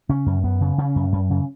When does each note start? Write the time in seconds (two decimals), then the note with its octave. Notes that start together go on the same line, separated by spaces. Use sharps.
0.09 C#3 C#4
0.26 F#2
0.44 F#2 B3
0.61 C#3
0.78 C#3 C#4
0.96 F#2
1.12 F#2
1.30 C#3